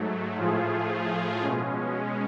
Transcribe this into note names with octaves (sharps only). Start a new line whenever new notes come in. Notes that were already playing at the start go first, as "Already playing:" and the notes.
Already playing: G#2 F#3 A3
A2 F3 A3 F4 G#4
B2 G#3 C#4